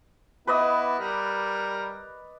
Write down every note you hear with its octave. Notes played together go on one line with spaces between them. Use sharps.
B3 E4 B4 D5 D#5
G3 A#4